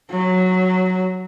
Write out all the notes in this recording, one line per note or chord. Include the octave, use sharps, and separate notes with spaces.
F#3